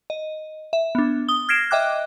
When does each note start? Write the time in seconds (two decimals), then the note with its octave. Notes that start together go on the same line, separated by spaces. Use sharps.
0.10 D#5
0.73 E5
0.95 B3 D4
1.28 D#6 G7
1.49 F6 G#6 A#6 C7 D7 E7
1.71 D#5 E5 G5 D6 F#6